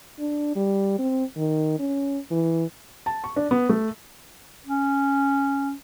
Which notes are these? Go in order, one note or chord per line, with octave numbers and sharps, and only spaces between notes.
D4
G3
C4
D#3
C#4
E3
A5
C#6
D4
B3
A3
C#4